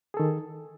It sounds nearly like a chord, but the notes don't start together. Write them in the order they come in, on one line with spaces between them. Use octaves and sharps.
G#4 A4 D#3